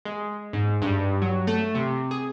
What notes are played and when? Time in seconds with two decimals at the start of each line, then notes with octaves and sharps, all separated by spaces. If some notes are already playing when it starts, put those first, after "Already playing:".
0.05 G#3
0.53 G#2
0.82 G2
1.22 F#3
1.47 A3
1.75 C3
2.11 G#4